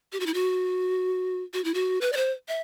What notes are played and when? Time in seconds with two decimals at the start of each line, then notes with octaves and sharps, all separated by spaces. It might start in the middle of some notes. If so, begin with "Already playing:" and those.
0.13 G4
0.20 F#4
0.26 E4
0.34 F#4
1.54 F#4
1.64 E4
1.74 F#4
2.01 B4
2.13 D5
2.17 C5
2.48 E5